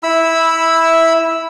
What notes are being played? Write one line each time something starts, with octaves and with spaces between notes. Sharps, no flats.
E4 B5 E6